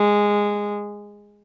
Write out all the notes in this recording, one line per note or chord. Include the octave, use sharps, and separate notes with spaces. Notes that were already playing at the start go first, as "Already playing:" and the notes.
Already playing: G#3